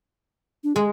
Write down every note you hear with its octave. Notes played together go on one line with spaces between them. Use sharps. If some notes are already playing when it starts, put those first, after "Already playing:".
D4
G#3 G#4